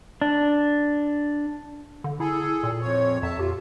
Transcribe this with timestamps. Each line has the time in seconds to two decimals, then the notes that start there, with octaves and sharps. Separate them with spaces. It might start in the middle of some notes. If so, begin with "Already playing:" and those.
0.22 D4
2.04 D3
2.20 E4 G#4 A4
2.63 A#2
2.81 F2 C#5
3.23 F2 E5 A5
3.39 F4 G4